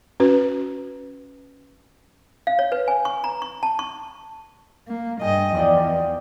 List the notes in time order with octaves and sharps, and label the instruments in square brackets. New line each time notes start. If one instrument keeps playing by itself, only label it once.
[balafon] C#4 F#4 B4
[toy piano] F5
C#5
B4
G#5
C#6
A#5
C#6
A5
C#6
[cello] A#3
[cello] G2 D#5 [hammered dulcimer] G#4 G5
[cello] E2 F3 [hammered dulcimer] D5 D#5 G5